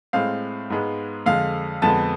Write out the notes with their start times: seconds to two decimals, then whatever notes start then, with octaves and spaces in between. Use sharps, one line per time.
0.13 A2 G#3 C4 F5
0.70 G#2 G#3 B3
1.26 F2 D3 G#3 F5
1.82 F2 D3 G#3 B3 A5